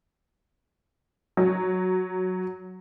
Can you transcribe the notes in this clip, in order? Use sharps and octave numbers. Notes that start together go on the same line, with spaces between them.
F#3